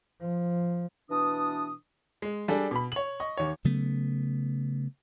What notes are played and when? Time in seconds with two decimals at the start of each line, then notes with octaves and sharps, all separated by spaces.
0.21 F3
1.11 B2 E3 D4 D#6
2.22 G#3
2.48 G3 D4 G#4 A4
2.71 B2 B5
2.92 C#5 F#7
3.20 D#5 C#6
3.37 D#2 C#5
3.65 C#3 F#3 A3 B3